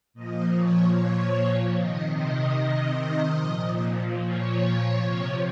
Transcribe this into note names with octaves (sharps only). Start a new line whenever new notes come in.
A#2 F3 D#5
C#5
C#5
C3 D#3 D#5
D#5
A#2 F3
C#5
C3 F3